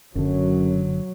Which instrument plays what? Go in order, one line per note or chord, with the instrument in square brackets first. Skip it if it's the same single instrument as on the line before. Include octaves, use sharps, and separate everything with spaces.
[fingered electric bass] F#1 D3 [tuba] F#2 [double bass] F#3